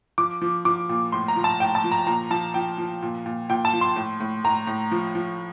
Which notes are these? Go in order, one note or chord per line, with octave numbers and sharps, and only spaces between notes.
F3 D6
F3
F3 D6
A#2
A2 C6
A#5
F3
A5
A2 G5
A5
F3
A#5
A#2 A#5
F3 A5
F3 G5
F3
A#2
A#2
A#2 G5
A5
F3
C6
A2
A2
A2 A#5
A2
F3
F3